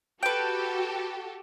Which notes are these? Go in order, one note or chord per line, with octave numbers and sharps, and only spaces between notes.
F#4 G4 A4 B4 G5